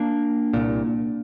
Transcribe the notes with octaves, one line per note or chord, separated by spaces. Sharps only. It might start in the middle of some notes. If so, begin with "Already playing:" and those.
Already playing: A#3 D4
C2 A#2